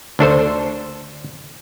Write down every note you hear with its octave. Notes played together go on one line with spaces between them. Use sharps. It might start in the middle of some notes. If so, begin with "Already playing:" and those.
D2 D4 A4 C5